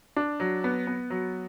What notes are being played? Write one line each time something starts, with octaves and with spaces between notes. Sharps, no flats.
D4
F#3
B3
B3
F#3